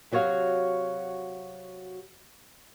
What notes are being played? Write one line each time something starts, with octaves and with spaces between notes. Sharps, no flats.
C3 F#3 F#4 C#5 F5